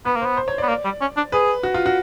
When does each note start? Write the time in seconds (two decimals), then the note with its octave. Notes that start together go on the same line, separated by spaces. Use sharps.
0.05 B3 B4
0.16 A#3
0.22 C5
0.25 B3
0.37 C5
0.48 C#5
0.58 B3 D5
0.69 A#3
0.85 G3
1.01 C#4
1.17 D4
1.32 G#4 B4
1.63 F#4
1.74 F4
1.86 F#4